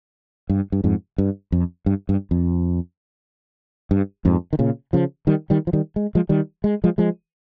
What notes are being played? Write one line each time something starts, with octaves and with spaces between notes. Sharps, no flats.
G2
G2
F2 G#2
G2
F2
G2
G2
F2
G2
F2 G#2
D#3
A#2 C#3
C#3 F3
D#3 G3
D#3 G3
F3
D#3 G3
G#3
F3 G#3
D#3 G3
G#3
F3 G#3
F3 G#3